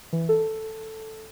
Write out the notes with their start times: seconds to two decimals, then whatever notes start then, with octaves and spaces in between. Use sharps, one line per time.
0.13 E3
0.29 A4